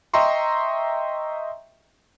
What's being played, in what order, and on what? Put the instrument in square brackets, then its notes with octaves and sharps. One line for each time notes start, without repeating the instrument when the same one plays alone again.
[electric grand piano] D#5 E5 G5 A#5 C6 C#6